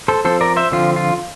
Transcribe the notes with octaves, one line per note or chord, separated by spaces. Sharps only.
A4 C5
F3 C4 A4 C5
A#4 D5
C5 E5
D3 F3 C4 F4
F4